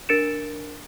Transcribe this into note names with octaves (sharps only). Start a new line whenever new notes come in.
D4 A#4 A6 C#7 D7 E7